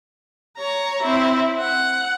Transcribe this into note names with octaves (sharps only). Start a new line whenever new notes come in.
C#5 A#5
C4 E4
F#5